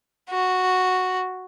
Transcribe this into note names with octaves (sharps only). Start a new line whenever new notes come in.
F#4